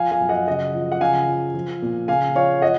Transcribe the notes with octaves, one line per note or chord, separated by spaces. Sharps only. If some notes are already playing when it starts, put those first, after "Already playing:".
Already playing: F3 F5 G#5
F5 G#5
F#2
D#5 F#5
C#3 D#5 F#5
F3
F#5
C#3 F5 G#5
F3
F3
A#2
C#3 F5 G#5
F3 C#5 F5
F3 D#5 F#5